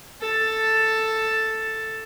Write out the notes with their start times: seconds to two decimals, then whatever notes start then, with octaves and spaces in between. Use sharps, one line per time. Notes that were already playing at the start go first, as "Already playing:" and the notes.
0.20 A4 A5